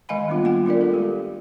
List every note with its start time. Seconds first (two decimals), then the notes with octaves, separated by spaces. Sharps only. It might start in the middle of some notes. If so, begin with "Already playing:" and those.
0.09 D#3 G#3 D#5 F5 G#5 B5
0.28 G3 A#3 B3 D4 F4
0.42 A3 A#3 F4 F#5 G5
0.66 D4 F4 A#4 D5
0.81 F4 A4 A#4
0.93 G#3 G4